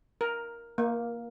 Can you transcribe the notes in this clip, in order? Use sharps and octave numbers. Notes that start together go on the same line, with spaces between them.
A#4
A#3